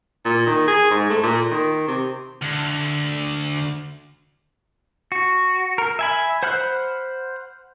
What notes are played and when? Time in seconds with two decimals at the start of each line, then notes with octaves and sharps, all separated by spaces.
0.25 A#2
0.46 D#3
0.68 G#4
0.90 G#2
1.10 A3
1.23 A#2
1.51 D#3
1.88 C3
2.42 D2
5.12 F#4
5.78 A#4
5.99 E5 G#5 B5
6.43 C5 F#5 B5 F6 F#6